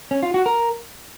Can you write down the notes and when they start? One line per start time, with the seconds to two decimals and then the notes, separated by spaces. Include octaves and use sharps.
0.11 C#4
0.23 F4
0.34 F#4
0.46 A#4